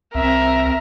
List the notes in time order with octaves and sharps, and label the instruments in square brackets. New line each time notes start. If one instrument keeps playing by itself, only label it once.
[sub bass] C2 [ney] C4 [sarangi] A#4 [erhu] E5